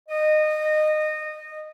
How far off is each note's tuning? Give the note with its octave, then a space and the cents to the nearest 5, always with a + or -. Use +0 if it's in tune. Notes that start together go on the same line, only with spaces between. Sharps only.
D#5 -20